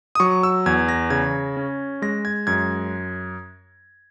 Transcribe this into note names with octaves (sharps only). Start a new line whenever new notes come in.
D#6
F#3 C#6
E6
E2 G#6
A#6
C#3 G#6
C#4
G#3 A#6
G#6
F#2 G#6